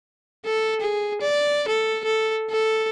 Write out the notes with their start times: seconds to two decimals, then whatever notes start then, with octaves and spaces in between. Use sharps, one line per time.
0.45 A4
0.81 G#4
1.21 D5
1.68 A4
2.05 A4
2.50 A4